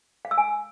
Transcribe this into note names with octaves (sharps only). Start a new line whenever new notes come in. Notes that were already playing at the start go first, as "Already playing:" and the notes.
F5
E6
G#5